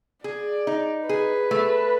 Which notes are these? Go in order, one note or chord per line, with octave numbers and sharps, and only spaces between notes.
G#4 D5
D#4
G#4 B4
A3